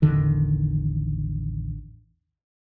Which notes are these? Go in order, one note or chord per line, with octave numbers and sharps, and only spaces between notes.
A1 E2 D3 D#3